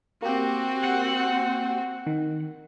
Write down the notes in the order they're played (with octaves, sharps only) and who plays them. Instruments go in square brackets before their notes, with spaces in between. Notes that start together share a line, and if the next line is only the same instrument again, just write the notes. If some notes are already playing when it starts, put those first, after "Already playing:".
[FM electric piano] A#3 G4 [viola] C4 F#4
[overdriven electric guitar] F#5
[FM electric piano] D#3